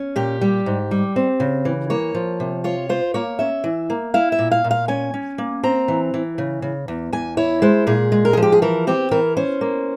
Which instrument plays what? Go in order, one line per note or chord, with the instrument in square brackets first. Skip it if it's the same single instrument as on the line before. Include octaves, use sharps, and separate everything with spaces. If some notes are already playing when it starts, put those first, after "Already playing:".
Already playing: [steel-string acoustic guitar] C#4
A#2 G4
G3
G#2
G3
C4
C#3
E3
A#3 C#5
F3
C3
F4 C#5
F4 C5
A#3 C#5
C#4 E5
E3
A#3
E4 F5
E5
A#2
F5
A#2
F5
C#4 G#5
C#4
A#3
C4 A#5
E3
E3
C#3
C#3
E2
E2 G#5
E4 C#5
G#3 C5
A#2 G#4
G#3
A#4
G#4
F3
G4
G#4
E3 A#4
C4 G4
E3 A#4
C#4 C5
A#3